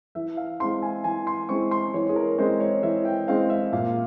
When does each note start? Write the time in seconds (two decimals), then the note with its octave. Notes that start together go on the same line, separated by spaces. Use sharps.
0.15 E3 E5
0.37 F5
0.60 G#3 C4 E4 C6
0.82 G#5
1.04 E3 G#5
1.27 C6
1.49 G#3 C4 E4 C#6
1.71 C6
1.94 E3 C#5
2.09 G#4
2.16 A#4
2.38 G#3 C4 E4 C5
2.60 C#5
2.83 E3 E5
3.05 G5
3.28 G#3 C4 E4 F5
3.50 E5
3.73 A#2 F5